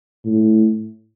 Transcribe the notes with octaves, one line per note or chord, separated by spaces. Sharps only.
A2